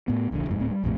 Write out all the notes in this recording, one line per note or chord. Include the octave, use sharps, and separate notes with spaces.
A2 B3
D#1 A#1 A#2 D3
F#1 F2 G#2
D1 A2 C4
G3
A#1 F2 A2 C3